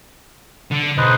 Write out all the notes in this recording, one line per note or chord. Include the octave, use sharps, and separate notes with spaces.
D3
B1 B4 C5 D#5